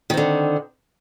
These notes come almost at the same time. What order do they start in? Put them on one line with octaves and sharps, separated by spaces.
D#3 C4 D3